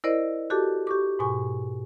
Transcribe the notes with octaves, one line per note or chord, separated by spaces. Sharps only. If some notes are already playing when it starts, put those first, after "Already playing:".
E4 A#4 C5 D5 D#5
F#4 G4 A4 A5 D6
G4 C#6 D6
G#2 B2 G#5 C#6